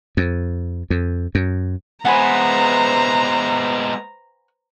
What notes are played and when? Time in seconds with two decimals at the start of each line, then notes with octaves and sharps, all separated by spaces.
0.17 F2
0.90 F2
1.35 F#2
2.05 G#3 B3 B4 C5 F#5 G#5 A#5 B5